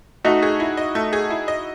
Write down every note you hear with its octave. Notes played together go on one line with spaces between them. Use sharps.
A3 D#4 F#4
G#4
E4
D#5
A3
G#4
E4
D#5